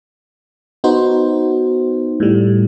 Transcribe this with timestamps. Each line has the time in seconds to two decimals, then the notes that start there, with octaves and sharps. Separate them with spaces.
0.84 B3 D#4 F#4 C5
2.20 A2 G3